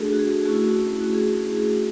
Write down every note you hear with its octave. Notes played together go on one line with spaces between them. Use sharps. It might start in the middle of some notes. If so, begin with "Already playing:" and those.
Already playing: A3 D4 F#4 G#4 A4
F#4
G#4
A3 C#4 E4 F#4
F#4
G#4